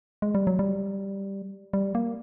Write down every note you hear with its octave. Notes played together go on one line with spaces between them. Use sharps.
G#3
G3
F#3
G3
G3
A#3